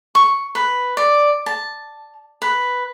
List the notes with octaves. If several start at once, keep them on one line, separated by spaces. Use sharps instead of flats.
C#6
B4
D5
A5
B4